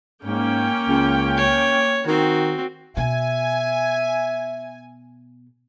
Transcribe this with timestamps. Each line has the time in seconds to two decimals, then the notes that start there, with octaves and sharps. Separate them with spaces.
0.25 G#2 A#3 C#4 G5
0.88 C#2
1.37 C#5
2.07 D#3 C4 F#4
2.97 B2 E5 G#5